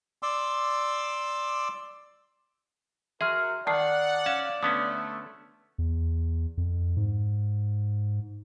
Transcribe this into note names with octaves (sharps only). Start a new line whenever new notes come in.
D5 C6 D6 E6
F#4 G#4 A#4 E5 C6 F6
D#3 D5 F#5 A5 C7
C#4 F5 A5
D3 A3 B3 C#4 D#6
E2
F2
G#2